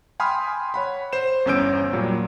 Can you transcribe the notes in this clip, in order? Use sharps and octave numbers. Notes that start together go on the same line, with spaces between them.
G5 G#5 B5 C6 D#6 F6
C#5 F#5 B5
C5 E7
G1 E2 C#4 E6 G6 D7
A#2 F#3 G3